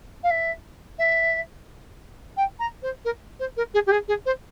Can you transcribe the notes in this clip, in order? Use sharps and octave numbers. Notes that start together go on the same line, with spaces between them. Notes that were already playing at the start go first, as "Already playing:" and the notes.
F5
E5
E5
G5
A#5
C5
A#4
C5
A#4
G#4
G4
G#4
G#4
C5